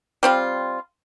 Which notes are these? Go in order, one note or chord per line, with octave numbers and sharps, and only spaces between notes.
G3 C4 F4